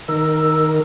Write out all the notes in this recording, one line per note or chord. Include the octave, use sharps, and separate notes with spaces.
D#3 A#4 E6